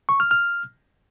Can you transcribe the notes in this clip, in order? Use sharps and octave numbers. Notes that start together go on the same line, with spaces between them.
C#6
F6
F6